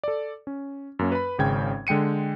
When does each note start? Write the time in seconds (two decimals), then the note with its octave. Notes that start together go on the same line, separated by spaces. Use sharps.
0.04 A4 D5
0.47 C#4
0.99 F#2 A#3 C#4
1.12 B4 B5
1.39 G#1 C#3 C#4 G5 G#6
1.87 D3 G#3 G5 C#7 D#7